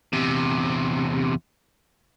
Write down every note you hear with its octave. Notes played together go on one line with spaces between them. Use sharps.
E2 C3